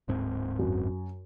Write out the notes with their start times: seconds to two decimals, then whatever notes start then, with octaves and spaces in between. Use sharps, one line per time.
0.08 D1 G#2 C4
0.59 F#2